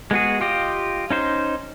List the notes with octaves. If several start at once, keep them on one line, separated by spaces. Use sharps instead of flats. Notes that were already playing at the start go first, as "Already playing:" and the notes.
G#3 B3 F#4 G#4
F4 G4 D#5
C#4 D#4 C5